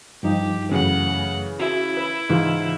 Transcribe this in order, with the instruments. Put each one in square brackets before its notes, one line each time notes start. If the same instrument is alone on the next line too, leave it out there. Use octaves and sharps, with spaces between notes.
[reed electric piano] G2 F3 D#4 [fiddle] G4
[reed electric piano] F#2 A3 C#4 [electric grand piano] C#3 E3 [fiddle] F#5
[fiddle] E4 [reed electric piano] F#4
[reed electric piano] B4
[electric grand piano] G#2 [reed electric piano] C#3 E3 F4